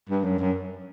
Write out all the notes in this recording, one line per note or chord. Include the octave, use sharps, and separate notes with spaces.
G2
F#2
F#2